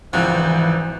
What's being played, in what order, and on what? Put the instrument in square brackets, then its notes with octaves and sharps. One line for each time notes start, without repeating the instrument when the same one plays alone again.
[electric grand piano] G#1 C#2 [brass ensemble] E3 [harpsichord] F3 [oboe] F#5